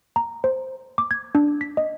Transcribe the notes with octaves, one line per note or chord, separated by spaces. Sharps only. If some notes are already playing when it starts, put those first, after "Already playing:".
A#5
C5
D6
G#6
D4
B6
D#5